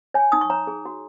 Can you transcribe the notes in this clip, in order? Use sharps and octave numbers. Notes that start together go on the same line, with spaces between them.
C#5 G#5
D#4 D#6
C#6
C#5 A#5
G#4
F#4